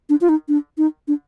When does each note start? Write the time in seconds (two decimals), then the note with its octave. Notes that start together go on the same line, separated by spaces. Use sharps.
0.10 D4
0.21 F4
0.29 D#4
0.48 D4
0.78 D#4
1.08 D4